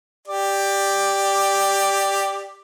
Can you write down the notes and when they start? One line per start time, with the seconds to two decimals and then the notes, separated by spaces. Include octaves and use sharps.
0.28 G4 D5